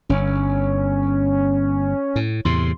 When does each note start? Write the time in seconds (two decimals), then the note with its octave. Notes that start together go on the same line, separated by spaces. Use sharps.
0.09 G1 C#4
2.16 A2
2.45 E2 A2 C3 C6